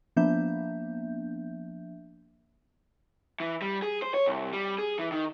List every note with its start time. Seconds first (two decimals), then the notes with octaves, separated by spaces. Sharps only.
0.16 F3 A#3 B3 D4 E5 G6
3.40 E3
3.62 G3
3.82 G#4
4.02 C5
4.14 C#5
4.26 C2
4.53 G3
4.78 G#4
4.99 E3
5.12 D#3